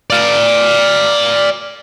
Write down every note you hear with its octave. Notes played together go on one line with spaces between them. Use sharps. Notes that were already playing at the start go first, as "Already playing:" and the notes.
D5 F5